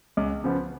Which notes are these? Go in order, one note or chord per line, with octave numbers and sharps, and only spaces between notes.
C#2
C#3 F3 B3